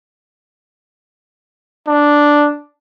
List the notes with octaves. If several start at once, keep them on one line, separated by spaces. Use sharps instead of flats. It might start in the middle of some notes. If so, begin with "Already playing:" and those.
D4